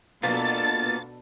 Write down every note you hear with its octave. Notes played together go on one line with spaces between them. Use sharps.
B2 A#3 B3 D4 F4 A4 A6